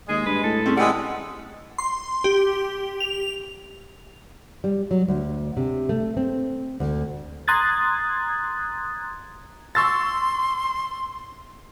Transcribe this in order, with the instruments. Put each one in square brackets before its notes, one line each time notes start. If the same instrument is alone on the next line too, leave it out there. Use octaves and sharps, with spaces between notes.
[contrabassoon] D#2 [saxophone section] G#3 [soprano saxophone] G#4
[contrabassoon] G2 [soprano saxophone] B4
[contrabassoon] A2 [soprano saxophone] A4
[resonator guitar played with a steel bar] C4 C#4 G#4
[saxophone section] E3 G3 G#3 [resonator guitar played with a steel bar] F#5 G#5
[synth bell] C6
G4
F7
[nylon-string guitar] G3
F#3
D2
C3
A3
C4
D2
[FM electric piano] A#5 C6 D#6 F#6 G#6 A6
[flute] C6 [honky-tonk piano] C#6 E6 A6